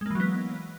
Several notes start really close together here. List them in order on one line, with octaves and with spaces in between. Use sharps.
G#3 A#3 E3 F#3 B3